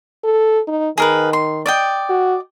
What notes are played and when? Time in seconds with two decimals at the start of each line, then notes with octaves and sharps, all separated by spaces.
0.24 A4
0.67 D#4
0.98 D#3 G#4 A#4 B4
1.33 C6
1.66 D5 D#5 G5
2.09 F#4